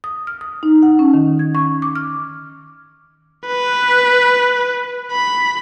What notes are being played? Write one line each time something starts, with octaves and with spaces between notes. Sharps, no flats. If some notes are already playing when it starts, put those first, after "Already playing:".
D#6
F6
D#6
D#4
F#5
C#4
D#3
G#6
C#6
D6
F6
B4
B5